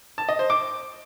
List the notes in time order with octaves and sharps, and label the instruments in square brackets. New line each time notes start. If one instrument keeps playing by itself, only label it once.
[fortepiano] A5
D#5
C5
D6